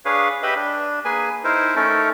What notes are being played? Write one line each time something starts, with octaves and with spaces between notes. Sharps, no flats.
D4 G#4 B4 C#5 F5
G4 B4 D#5 E5 B5
D4
A#3 G#4 B4 G#5
D#4 E4 A#4 C5
A3 C#4 D#4 A4 A#4